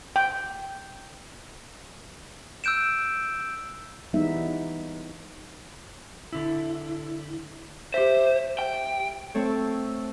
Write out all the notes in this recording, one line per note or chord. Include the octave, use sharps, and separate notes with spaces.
G5
E6 F#6 G6 D7 E7
E3 G3 G#3 B3 D#4 E5
D3 E4
G4 C5 E5
G5
A3 C4 A4 C#5